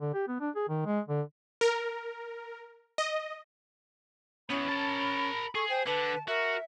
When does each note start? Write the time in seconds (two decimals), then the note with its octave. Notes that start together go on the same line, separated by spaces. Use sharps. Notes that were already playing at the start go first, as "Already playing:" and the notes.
0.01 D3
0.14 G4
0.28 B3
0.40 D4
0.56 G#4
0.69 D#3
0.86 G#3
1.09 D3
1.61 A#4
2.98 D#5
4.50 E3 B3 C#4 B5
4.68 A#4 A5
5.55 G#4 A4 C#6
5.69 C5 G5
5.87 D3 B4 A5
6.28 F#4 A#4 E5